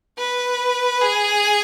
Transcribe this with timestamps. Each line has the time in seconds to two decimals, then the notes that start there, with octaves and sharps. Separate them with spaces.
0.18 B4
1.01 G#4